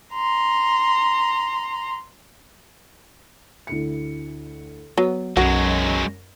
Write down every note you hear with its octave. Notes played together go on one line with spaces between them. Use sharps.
A#5 C6
D2 E4 C#7
F#3 B3
B1 F#2 F#3 G#3 F#4